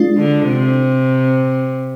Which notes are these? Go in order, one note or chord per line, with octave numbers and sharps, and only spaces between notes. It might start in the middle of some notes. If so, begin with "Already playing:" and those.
Already playing: G#3 D4 F4
D3
C3